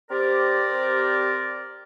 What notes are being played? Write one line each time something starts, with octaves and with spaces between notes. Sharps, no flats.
C4 G4 A#4 D5